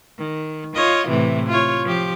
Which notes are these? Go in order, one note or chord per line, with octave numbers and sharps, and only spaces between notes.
D#3
F4 C#5 D#5
A2 C3 E3
F4 C#5
F3 G4